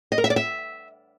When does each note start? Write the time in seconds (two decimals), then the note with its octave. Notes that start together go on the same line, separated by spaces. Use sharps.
0.12 D#5
0.18 A#4
0.24 E5
0.30 D5
0.36 E5